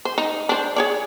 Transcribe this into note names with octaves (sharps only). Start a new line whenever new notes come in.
C5
D#4
D4 C5
G#4 C#5 D5